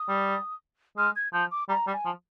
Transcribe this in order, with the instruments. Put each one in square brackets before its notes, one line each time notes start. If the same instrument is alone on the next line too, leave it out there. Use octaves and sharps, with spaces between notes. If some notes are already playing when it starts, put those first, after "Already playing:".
Already playing: [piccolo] D#6
[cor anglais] G3
[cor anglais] G#3 [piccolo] F6
[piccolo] G#6
[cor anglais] F3 [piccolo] G6
[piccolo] D6
[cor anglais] G3 [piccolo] A#5
[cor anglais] G3
[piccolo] G#5
[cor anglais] F3